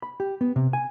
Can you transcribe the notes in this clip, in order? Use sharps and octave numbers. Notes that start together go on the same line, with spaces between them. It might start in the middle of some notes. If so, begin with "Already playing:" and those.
B5
G4
B3
C3
G#5